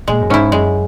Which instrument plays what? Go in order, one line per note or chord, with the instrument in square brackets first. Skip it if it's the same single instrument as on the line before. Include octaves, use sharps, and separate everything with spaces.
[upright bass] A#2 [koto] G#3
[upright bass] F#2
[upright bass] G#2 [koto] C#4 E4
[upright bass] F#2 [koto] G#3